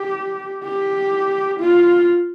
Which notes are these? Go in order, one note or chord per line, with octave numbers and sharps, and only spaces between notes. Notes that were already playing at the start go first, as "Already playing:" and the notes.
Already playing: G4
G4
F4